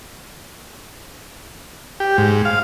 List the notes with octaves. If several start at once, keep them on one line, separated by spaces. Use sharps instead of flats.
G4
G#2
F5